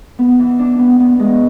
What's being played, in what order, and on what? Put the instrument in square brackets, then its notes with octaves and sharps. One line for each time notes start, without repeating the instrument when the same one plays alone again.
[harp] B3
E3
D4
B3
B3
G#3